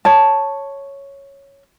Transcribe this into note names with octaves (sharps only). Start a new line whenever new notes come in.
C#5 A5